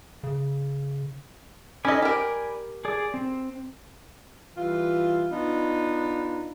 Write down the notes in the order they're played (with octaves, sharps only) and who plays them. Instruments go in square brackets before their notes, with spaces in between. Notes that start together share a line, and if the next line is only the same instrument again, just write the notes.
[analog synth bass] C#3
[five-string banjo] C#4 D#4 D#5 [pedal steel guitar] D5 G#5 B5
[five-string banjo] G4 A#4
[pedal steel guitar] G#4 D5
C4
[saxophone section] E3 G3 F4
B3 D4 D#4 F4